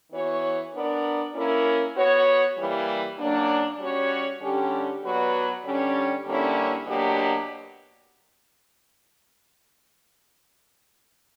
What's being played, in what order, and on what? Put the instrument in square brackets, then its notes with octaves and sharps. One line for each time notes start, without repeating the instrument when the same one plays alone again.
[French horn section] E3 B3 F#4 C#5
B3 D4 A#4 D5
A#3 C#4 E4 A#4
B3 F#4 C#5
E3 G3 A#3
C#3 F#3 A#3 D4
G3 C#4 F#4 C#5
D3 G3 C#4 G4
F#3 B3 F#4 B4 D5
D3 G3 C#4 G4 C#5
D3 G3 A#3 C#4 E4
B2 F#3 A#3 D4 G4